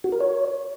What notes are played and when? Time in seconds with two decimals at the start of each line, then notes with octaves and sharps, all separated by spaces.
0.04 F#4
0.12 A#4
0.20 C#5